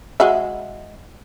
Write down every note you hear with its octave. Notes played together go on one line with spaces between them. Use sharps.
G#3 F#4 E5